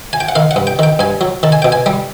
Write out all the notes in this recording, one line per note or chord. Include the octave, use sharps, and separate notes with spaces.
G#5
G5
F#5
D#3 F5
F#5
G2
G5
D#3 G5
G2 G#5
F#3
D#3 A5
G#5
B2 G5
G#5
G3